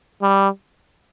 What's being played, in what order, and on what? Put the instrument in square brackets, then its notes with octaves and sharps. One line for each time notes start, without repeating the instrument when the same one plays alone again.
[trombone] G3